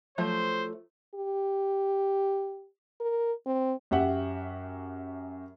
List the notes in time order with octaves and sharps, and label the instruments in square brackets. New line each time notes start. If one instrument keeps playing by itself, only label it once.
[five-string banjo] F3 F#3 A3 [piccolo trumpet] C5
[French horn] G4
A#4
C4
[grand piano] F#2 G4 E5 F#5